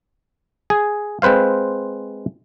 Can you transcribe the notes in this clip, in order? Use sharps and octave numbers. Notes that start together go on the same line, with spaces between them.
G#4
G#3 C4 B4 C5 F5